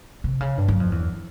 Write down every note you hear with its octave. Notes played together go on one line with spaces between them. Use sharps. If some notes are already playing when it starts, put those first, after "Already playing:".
C3
C#3
G2
F#2
F2
E2